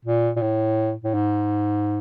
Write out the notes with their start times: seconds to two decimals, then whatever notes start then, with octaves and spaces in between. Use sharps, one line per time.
0.05 A#2
0.36 A#2
0.41 A2
1.04 A2
1.14 G#2